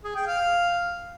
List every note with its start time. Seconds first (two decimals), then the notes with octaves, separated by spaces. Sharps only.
0.04 G#4
0.15 G5
0.27 F5